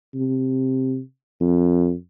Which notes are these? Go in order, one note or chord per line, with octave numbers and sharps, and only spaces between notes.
C3
F2